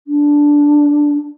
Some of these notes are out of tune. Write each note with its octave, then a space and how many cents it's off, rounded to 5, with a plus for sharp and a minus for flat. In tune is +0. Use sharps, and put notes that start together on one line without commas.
D4 -5